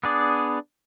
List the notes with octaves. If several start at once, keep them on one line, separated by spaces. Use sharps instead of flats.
B3 D4 G#4 D5